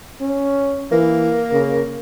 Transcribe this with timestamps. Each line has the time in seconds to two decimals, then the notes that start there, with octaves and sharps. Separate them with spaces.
0.21 C#4
0.92 E3 A#3
1.52 C#3